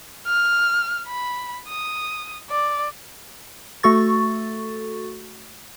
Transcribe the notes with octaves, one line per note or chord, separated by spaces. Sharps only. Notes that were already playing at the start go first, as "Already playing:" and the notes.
F6
B5
D#6
D5
A3 F#4 A4 C#6 A6